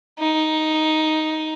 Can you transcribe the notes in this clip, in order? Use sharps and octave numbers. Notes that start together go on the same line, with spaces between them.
D#4